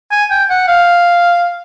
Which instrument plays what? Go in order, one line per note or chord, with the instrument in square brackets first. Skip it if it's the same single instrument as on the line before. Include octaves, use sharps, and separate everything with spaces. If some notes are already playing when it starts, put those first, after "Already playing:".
[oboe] G#5
G5
F#5
F5